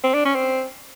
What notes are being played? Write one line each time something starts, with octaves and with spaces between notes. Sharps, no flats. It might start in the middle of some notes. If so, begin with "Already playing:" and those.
C4
D4
C#4
C4